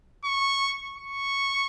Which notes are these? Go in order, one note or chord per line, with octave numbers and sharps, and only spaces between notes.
C#6
C#6